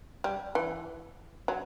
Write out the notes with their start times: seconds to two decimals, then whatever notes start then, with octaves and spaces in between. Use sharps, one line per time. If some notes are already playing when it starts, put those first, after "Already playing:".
0.24 G3
0.55 E3
1.48 F#3